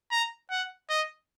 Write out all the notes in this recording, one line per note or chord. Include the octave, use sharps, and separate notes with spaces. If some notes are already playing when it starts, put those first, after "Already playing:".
A#5
F#5
D#5